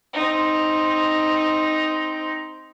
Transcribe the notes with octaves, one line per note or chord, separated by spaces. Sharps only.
C4 D#4